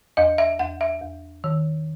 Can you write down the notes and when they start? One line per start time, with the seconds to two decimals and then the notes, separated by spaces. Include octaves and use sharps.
0.17 E2 D#5
0.38 E5
0.59 E2 F#5
0.81 E5
1.01 E2
1.44 D#3